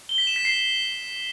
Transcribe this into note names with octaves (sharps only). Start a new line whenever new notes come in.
G7
B6
E7
B6
C7